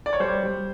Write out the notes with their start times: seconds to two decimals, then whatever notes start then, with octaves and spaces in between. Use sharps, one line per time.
0.06 D5
0.13 C#5
0.20 G3 C5
0.43 G3